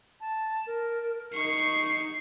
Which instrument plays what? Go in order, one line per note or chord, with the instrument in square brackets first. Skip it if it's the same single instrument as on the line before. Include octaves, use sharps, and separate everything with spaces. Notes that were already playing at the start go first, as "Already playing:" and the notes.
[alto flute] A5
A#4
[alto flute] D#4 [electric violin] C#6 C7